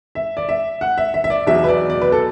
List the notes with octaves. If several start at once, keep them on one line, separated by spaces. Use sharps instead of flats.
E5
D5
E5
F#5
E5
E5
E5
D5
E2 B2 F#3 E5
B4
D5
D5
B4
A4